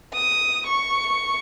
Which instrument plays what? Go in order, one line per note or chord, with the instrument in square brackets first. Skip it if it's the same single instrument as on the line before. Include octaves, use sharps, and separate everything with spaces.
[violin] D#6
C#6